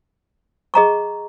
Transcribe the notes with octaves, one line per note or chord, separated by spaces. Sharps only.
G#4 D#5 A#5 C#6